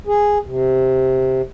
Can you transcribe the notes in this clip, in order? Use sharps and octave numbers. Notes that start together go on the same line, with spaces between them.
G#4
C3